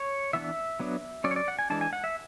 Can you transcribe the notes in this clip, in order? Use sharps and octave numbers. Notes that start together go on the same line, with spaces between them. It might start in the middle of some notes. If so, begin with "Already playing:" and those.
Already playing: C#5
E3 B3 D4 E5
F#3 B3 D4
F#3 C#4 D5
C#5
D5
F#5
G#5
E3 G#3 D4 A5
G#5
F#5
E5